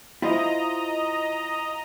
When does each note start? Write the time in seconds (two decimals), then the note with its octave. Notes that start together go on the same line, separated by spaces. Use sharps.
0.22 E4 F4 C5 D#5 A#5